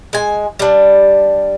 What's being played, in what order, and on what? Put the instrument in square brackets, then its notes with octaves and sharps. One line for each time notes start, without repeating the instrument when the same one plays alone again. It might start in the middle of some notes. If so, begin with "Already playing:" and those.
[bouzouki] G#3 G#5
G3 D4